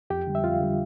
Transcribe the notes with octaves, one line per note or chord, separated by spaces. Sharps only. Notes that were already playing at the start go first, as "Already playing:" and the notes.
F2 G4 G5
D3 G3
E5
F2 F4 F5
D3 G3